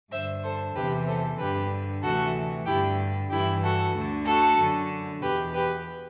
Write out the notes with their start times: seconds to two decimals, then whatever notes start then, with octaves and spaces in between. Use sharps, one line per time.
0.11 G2 D3 C5 E5
0.44 A4 C5
0.75 E2 C3 E3 G4 B4
1.07 A4 C5
1.39 G2 D3 G4 B4
2.03 D2 C3 E3 F#4 A4
2.67 G2 D3 E4 G4
3.30 G2 E3 E4 G4
3.63 F#4 A4
3.94 D2 D3
4.26 F#4 A4
4.59 F#2 D3
5.22 E2 B2 G4 B4
5.54 G4 B4